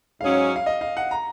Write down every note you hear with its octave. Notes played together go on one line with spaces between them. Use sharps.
G#2 F#3 C#4 G#4 F5
F5
D#5
F5
F#5
A#5